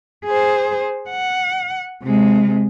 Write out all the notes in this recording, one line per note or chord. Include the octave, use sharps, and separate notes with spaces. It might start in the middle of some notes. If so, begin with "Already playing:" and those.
G#4 C5
F#5
C3 G#3